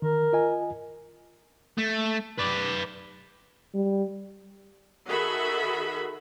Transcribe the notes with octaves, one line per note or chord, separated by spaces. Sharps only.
D#3 A#4
F4 D#5 G#5
A3
B4 D5
G3
D#3 F#4 G#4 A4 E5 B5